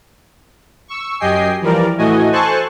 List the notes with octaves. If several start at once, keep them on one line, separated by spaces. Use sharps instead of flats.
C#6 E6
F#2 G4 D#5 G5 G#5 C7
E3 F3 G3 A#4 D5
A2 E3 A3 F#4 D#5 G#5
A4 C5 G#5 A5 C#6 F#6